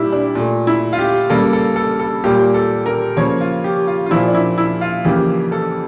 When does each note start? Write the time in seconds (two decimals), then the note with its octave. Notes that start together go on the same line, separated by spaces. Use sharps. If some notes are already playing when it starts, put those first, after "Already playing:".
Already playing: A#2 G3 A#3 E4 G4
0.12 D4
0.35 A#2 A3
0.67 E4
0.93 F4
0.99 G4
1.30 C#3 G3 A#3 A4
1.53 A4
1.76 A4
1.99 A4
2.24 A#2 G3 A#3 G4
2.54 A4
2.86 A#4
3.16 C#3 F3 A#3 C#5
3.41 F4
3.64 G4
3.87 F4
4.06 F4
4.11 A#2 F3 A#3 E4
4.28 D4
4.34 E4
4.58 E4
4.81 F4
5.05 F2 C#3 E3 A#3 G4
5.52 A4